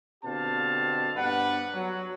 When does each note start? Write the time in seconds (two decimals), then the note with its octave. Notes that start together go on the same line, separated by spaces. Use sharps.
0.24 B2 D3 C4 G4 F5 A5
1.16 G2 B3 D4 B4 F#5
1.73 F#3